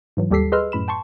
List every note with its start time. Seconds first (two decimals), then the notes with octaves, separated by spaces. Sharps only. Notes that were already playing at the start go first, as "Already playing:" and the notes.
0.17 G#2 E3 F#3
0.31 D#2 G3 G4 A4 B6 C7
0.52 G#4 B4 D#5 C6 E6 F6
0.72 F#2 A2 B5 E7
0.88 G5 A5 C6 C#6